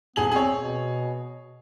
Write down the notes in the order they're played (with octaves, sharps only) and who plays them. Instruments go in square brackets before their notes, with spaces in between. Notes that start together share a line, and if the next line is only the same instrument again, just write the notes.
[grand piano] D#1 G#4 F#7 [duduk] B3
[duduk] C4 [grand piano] G#4 C#5
[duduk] B2